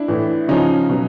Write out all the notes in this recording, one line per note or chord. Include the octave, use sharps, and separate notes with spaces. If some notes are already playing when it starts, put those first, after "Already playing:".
Already playing: D4 E4
A2 E3
C#3 F3 C#4 D#4
B2 F#3